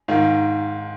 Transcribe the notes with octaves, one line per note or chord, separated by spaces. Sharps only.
G#2 D#3 F5